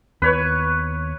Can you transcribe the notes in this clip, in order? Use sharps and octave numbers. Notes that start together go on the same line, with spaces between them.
D#2 B3 B4 C#5